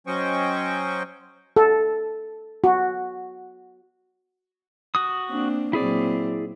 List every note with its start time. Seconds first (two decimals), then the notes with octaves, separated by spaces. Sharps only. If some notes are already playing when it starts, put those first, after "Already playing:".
0.07 F#3 C#4 C5 D#5 G5 C#6
1.57 A4
2.64 F#4
4.95 F#4 D#6
5.31 A#3 C4 D4
5.73 A#2 F#3 C4 E4 G#4 D5